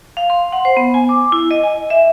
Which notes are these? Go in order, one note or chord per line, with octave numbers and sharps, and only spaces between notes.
F5
C6
F#5
C5
B3
G#5
D6
E4
D#5
G#5
E5